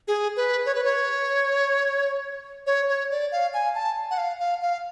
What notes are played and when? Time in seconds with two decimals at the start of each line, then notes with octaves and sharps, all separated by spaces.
0.08 G#4
0.37 B4
0.66 C#5
0.75 B4
0.84 C#5
2.67 C#5
2.89 C#5
3.11 D5
3.32 F5
3.54 G#5
3.75 A5
4.11 F#5
4.18 F5
4.40 F5
4.62 F5